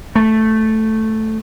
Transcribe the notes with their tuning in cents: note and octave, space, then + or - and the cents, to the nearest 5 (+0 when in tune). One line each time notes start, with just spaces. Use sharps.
A3 +0